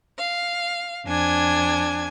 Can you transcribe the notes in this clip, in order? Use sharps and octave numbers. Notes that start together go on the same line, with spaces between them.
F5
F2 D4 G#5 G#6